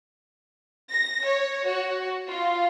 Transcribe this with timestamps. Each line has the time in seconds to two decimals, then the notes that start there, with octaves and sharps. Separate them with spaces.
0.89 A#6
1.24 C#5
1.65 F#4
2.28 F4